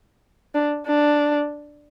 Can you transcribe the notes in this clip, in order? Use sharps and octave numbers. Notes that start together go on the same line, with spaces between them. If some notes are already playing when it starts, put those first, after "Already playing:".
D4
D4